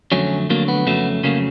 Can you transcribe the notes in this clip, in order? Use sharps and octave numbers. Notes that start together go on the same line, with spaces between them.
F2 D3 F#3 A3 C#4
F2 D3 F#3 A3 A#3
B3
F2 C#3 F#3 A3
F2 C#3 F#3 A3 A#3